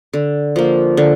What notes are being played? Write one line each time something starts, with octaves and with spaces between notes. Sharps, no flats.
D3
F3 A#3
D3